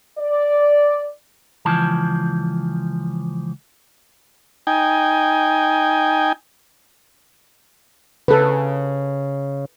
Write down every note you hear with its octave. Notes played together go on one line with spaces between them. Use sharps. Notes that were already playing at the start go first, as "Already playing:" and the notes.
D5
C#2 E3 F3 A5
D#4 G5 G#5
C#3 A4 B4